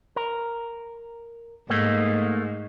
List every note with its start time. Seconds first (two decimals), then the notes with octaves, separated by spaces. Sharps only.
0.16 A#4
1.70 G#2 A3 A#3